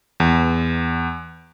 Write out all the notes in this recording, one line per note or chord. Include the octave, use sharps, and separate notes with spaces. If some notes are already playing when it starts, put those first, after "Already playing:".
E2